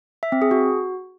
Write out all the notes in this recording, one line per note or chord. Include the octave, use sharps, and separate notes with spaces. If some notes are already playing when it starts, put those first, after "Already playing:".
E5
C4
G#4
F#4